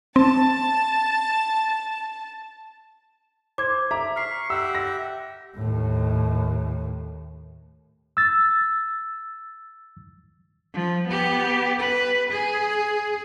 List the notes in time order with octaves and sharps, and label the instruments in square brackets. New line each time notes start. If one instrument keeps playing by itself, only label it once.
[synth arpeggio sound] C4 [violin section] A5
[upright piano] C5 [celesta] D6 G#6
[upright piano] E5 A#5 D6 [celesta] B6
[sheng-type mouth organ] C#6 [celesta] F6 B6 C7
[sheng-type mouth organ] G4 E5 F#5 [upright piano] E6
[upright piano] A#6
[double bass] D#2 A2
[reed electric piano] E6 A6
[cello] F3
B3 G4
B4
G#4